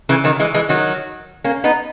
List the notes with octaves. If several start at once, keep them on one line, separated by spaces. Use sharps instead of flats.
C#3 E3
D#3 F#3
E3 G#3
E3 G#3
D#3 F#3
A#3 C#4
B3 D#4